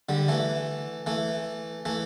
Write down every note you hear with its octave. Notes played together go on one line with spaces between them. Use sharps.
D3 G3
E3 A3
E3 A3
E3 A3